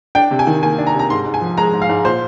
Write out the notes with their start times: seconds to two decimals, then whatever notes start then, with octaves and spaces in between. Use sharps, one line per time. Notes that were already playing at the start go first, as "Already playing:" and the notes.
0.15 D4 G5
0.31 C3
0.39 G#5
0.47 D#3
0.63 A#3 G#5
0.78 D4
0.87 A#5
0.94 C3
0.99 A#5
1.10 G#2 C6
1.26 G#2
1.34 G#5
1.41 F3
1.57 G#3 A#5
1.74 G#2
1.82 F5
1.89 G#2
2.04 A#2 C5